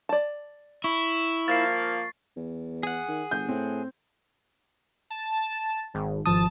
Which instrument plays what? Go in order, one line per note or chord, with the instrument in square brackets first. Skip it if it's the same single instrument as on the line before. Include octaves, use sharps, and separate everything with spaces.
[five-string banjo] D5 A5
[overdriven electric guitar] E4 [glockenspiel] C#6
[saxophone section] F3 A#3 [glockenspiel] A6 C7
[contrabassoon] E2
[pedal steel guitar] G#4 F#5
[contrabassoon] D#3
[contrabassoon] G1 [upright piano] G6
[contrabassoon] A2 [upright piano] C4
[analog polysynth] A5
G#1
[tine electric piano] G#1 F3 D#6 [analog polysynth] A5